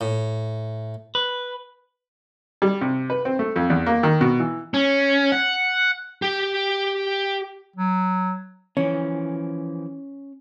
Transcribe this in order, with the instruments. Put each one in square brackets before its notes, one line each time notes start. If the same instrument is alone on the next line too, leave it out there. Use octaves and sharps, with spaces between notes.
[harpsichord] A2
[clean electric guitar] B4
[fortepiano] G3
C3
B4
C4
A3
F2
E2
A#3
D#3
B2
E3
[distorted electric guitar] C#4
F#5
G4
[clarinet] F#3
[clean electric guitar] E3 F3 [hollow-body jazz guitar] C#4